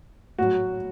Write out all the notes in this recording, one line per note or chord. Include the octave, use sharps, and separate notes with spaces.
A2 F#3 F#4